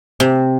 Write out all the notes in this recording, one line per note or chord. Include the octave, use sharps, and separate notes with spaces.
C3